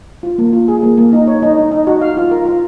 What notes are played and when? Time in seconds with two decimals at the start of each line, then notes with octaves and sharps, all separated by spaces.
0.23 F4
0.38 A#3
0.53 F4
0.68 G#4
0.83 A#3
0.98 A#3
1.13 D#4
1.27 C#5
1.43 D#4
1.57 D#4
1.72 D#4
1.87 F#4
2.01 F5
2.17 F4
2.31 A#4
2.45 F4